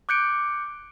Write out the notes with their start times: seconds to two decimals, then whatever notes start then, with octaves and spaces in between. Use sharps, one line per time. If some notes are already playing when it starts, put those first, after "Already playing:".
0.09 D6 F#6 G6 C#7 D7